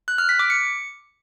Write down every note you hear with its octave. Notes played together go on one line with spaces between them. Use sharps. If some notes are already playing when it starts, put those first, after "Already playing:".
F#6
F6
B6
D6
C#7